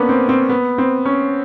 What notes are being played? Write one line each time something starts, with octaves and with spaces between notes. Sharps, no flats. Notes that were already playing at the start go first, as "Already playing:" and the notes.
Already playing: A#3 B3 C#4 D4
C4
C4
B3
C4
C#4